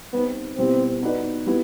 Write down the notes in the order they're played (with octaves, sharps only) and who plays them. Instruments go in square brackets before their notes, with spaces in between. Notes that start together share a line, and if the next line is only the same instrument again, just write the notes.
[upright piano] G3 C4 D#4 [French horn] B3
[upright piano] B2 G3 B3 E4 G4 [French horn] C4
[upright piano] B3 D#4 F#4 B4 D5
G3 B3 E4